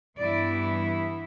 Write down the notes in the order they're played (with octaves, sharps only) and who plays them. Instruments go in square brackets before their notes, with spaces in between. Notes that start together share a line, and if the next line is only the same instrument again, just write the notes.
[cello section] G2 E3 B3 E4 D5